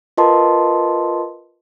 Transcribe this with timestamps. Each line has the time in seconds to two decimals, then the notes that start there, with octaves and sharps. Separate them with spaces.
0.18 F4 A#4 B4 D#5 A5 C6